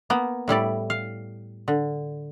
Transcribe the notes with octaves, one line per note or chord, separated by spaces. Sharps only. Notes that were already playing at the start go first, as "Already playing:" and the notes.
A#3 B3
A2 G3 E4 D5
F5
D3